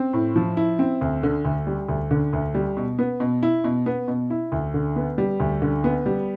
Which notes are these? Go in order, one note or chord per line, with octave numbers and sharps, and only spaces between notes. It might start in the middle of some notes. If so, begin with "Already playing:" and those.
Already playing: C4
A2
F3
E4
C4
D2
D3
D2
G3
D2
D3
D2
G3
B2
B3
B2
E4
B2
B3
B2
E4
D2
D3
B3
G3
D2
D3
B3
G3